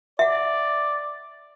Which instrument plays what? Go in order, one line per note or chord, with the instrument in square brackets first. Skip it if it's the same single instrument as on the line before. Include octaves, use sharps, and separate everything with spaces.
[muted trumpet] D5 [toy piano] E5 F#5